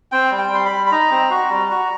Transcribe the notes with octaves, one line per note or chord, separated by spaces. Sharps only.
C4 G5
G3
G5
G3 C6
B5
G3
B5
D#4 A#5
C4
F#4
G3
F#4